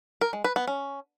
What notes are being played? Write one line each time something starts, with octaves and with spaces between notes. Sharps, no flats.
A#4
G#3
B4
B3
C#4